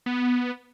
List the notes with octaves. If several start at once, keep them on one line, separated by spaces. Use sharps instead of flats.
B3